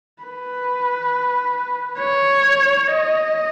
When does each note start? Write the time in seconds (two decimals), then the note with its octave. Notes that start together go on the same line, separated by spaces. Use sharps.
0.23 B4
1.99 C#5
2.87 D#5